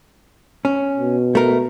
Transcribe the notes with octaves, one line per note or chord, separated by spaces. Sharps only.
C#4
B2
A3 A#4